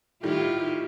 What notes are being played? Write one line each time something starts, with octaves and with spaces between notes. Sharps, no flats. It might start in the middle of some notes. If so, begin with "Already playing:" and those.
A2 D#3 G3 E4 F4 G4